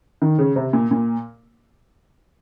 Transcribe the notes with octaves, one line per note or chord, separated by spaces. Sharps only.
D#3
C#3
C3
A#2
A#2